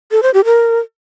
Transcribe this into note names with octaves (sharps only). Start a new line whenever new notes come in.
A4
C5
G4
A#4